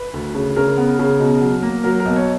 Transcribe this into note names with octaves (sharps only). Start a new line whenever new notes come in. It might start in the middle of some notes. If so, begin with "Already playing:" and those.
Already playing: B4
D2
C#3
C#3 A#4
B3
C#3
B2
F#3
A#3
F#3 A#4
A#4
B1
C#5